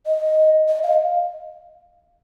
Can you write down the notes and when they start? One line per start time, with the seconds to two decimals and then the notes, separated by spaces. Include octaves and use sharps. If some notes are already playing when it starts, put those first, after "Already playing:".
0.06 D#5
0.68 D#5
0.83 F5